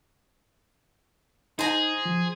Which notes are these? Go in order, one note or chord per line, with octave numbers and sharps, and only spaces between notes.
D#4 G#4 C5 A#5
F3